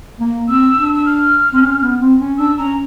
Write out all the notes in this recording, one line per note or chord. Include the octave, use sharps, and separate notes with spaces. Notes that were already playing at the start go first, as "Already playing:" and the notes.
A#3
C4 E6
D4
E6
F6
C4
C#4
B3
C4
C#4
D4 E6
C#4 A#5